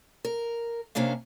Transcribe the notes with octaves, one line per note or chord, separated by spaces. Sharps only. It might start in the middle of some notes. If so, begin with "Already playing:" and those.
A#4
C3 A#3 C#4 D4 F5